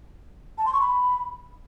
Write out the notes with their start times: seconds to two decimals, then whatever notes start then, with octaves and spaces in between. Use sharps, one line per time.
0.58 A5
0.66 C6
0.73 C#6
0.81 B5